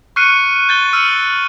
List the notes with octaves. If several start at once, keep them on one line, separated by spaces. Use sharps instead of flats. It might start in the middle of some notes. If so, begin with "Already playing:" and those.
C#6 F6 F#6 C7 C#7 D#7
G6 A6 G7
E6 F6 C#7 D#7